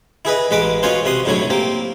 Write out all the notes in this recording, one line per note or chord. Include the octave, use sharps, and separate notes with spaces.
E4 G#4 B4 D#5
A1 G#3 B4 D#5 D6
B3 C#4 F4 F#4 C5 C#5
C3 F#4 C6 D#6
C#2 A2 D3 F#3 E4 C#5
A#3 C4 G4